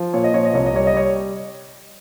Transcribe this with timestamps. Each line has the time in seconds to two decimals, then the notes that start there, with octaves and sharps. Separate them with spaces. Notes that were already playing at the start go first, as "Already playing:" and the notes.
Already playing: F3
0.13 A#2 C#5
0.24 D#5
0.34 F3 C#5
0.45 D#5
0.54 C2 C#5
0.66 D#5
0.74 G3 C#5
0.87 D#5
0.93 G3 C#5